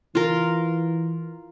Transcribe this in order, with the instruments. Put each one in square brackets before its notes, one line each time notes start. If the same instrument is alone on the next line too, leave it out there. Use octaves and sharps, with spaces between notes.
[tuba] E3 [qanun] F4 A#4